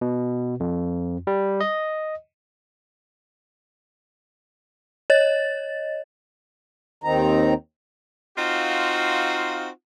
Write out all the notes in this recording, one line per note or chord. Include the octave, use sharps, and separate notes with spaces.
B2
F2
G3
D#5
C#5 D#5 A6
D#2 D#3 C4 D#4 A#5
C4 D#4 F4 F#4 F5